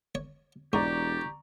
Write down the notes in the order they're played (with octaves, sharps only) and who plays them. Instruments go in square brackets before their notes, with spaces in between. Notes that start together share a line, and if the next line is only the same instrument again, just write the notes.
[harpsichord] C#5
[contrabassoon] E1 [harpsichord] G#2 [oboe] G4 [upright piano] D5 A#5 C#6